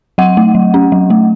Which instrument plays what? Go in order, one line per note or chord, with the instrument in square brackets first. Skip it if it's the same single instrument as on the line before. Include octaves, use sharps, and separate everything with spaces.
[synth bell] F#3 F#5
A3
F#3
C#4
F#3
A3